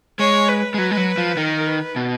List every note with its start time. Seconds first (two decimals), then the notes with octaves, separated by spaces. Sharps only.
0.19 G#3 C#5
0.49 B4
0.74 G#3
0.78 F#3
0.91 G#3
0.97 F#3
1.18 F3
1.37 D#3 A#4
1.67 B4
1.96 B2